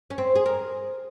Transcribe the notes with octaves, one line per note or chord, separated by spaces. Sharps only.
C#4
C4
G#4
A#4